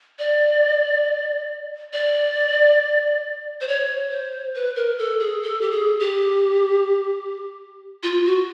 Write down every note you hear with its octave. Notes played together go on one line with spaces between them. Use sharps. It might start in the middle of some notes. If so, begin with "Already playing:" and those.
D5
D5
C5
C#5
C5
B4
A#4
A4
G#4
A4
G4
G#4
G4
F4
F#4